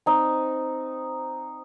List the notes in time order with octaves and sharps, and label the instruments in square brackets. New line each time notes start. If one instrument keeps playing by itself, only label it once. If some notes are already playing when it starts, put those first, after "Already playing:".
[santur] C4 D#4